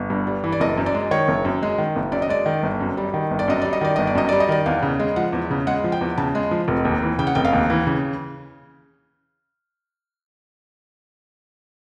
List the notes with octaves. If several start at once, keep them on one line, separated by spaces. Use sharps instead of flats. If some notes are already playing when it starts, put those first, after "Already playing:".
Already playing: G1
G2
G3
E3
D5
F#1 D#5
F#2
D5
G#3
D#3 C#5
F#1
F#2
G#3
D#3
F#1
F#2 D5
D#5
G#3 D5
D#3
G1
F#2
G3
D#3
G1
D5
F#2 D#5
G3 D5
D#5
D#3 D5
G1 D#5
D5
F#2 D#5
G3 D5
D#5
D#3 D5
E2 F5
C#3
G#3
F3 F#5
E2
C#3
G#3 F#5
F3
G5
E2
C#3 A5
G#3
F3
F1
D#2
E3
C#3 G5
F#5
F1 G5
F5
D#2
E3
C#3